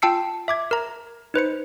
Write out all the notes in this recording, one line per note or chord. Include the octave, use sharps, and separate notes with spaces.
F4 G5 A5 E6 C7 C#7
E5 D6 G#6
A#4 A#5
D#4 B4 C5 C#7